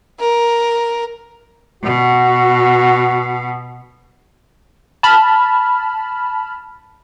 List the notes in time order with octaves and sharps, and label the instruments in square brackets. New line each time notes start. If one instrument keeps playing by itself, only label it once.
[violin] A#4
[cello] B2 [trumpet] F#4
[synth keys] A5 B5 F6